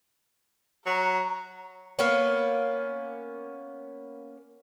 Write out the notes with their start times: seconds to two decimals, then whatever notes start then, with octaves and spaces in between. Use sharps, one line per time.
0.86 F#3 A#5
1.99 A#3 B3 C#4